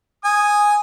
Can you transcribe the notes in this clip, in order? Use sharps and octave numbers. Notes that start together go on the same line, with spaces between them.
G#5 D#6